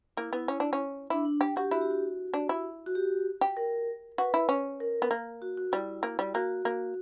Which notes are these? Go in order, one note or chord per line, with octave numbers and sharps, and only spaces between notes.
A#3 E4
B3 E4
C#4
D4
C#4
D4 E4
D4
G4
F#4 G4
E4 F#4
G4
F#4
D4
E4
F#4
G4
G4
A#4
F#4 B4
E4
C#4
A#4
B3
A#3
F#4
F#4
G3 E4
A#3
G3
A#3 F#4
A#3